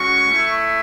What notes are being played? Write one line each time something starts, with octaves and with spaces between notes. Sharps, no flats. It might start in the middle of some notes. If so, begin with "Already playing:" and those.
Already playing: G#3 C#4 F#4 C#6
A3 E4